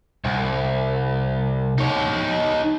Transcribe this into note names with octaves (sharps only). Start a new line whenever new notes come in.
C2
D#4 C#5